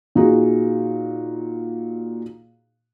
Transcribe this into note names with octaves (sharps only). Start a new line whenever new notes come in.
A#2 D#4 F#4 G#4